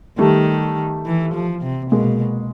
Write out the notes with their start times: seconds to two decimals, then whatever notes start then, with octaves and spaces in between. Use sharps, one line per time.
0.19 D#3 G3 A3
1.06 E3
1.34 F3
1.62 C3
1.91 B2 G#3 A#3